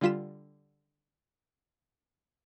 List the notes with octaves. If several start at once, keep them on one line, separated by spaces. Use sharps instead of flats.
D3 G3 F4 B6 E7